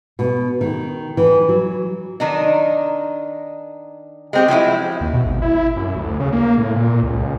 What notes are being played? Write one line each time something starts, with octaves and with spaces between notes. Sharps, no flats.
B2
D#3
E3
F#3
D#3 D4 D#4
G#3 C4 G4
F3 F#3 G#3 E4
D#2
B2
G#1
E4
F#2
D2
C#3
A#3
A2
A#2
C#2